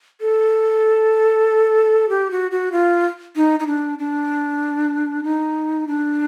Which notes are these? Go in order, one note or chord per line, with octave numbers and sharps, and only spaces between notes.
A4
G4
F#4
F#4
F4
D#4
D#4
D4
D4
D#4
D4